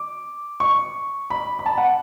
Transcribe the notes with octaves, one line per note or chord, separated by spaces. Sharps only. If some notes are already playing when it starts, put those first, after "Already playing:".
Already playing: D6
C#6
B5
B5
A5
F#5